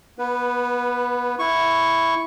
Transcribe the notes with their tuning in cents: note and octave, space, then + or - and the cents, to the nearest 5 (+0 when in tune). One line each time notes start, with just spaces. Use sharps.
B3 -25 B4 +0
E4 +0 C#6 +0